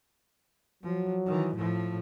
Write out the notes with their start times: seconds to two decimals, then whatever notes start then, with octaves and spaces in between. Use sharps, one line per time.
0.83 F3 F#3
1.26 D#3 E3
1.55 A2 F3